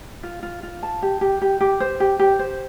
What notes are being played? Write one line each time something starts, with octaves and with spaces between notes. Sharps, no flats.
F4
F4
F4
A5
G4
G4
G4
G4
C5
G4
G4
C5